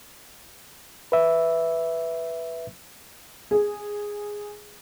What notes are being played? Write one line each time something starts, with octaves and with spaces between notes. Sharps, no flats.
B4 E5
G#4